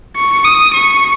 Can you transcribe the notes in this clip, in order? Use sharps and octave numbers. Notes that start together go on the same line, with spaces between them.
C#6
D#6
C#6